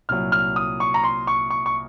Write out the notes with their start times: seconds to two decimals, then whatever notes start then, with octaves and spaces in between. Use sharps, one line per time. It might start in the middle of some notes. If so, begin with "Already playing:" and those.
0.09 C2 A#2 F#3 F6
0.32 F6
0.56 D#6
0.80 C#6
0.94 A#5
1.04 C6
1.27 C#6
1.50 C#6
1.66 C#6